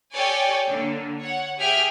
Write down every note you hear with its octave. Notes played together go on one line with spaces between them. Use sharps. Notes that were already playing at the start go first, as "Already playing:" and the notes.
G4 A4 C#5 D5 G5 G#5
D3 A#3
C#5 F#5
G4 G#4 E5 G5 F6